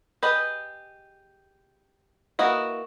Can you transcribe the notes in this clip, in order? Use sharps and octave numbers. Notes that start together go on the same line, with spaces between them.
G4 G#4 B4 D#5
A#3 E4 F#4 B4 D#5